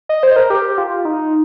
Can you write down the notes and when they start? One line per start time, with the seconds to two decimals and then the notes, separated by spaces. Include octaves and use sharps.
0.09 D#5
0.23 C5
0.36 A#4
0.50 G4
0.78 F4
1.05 D#4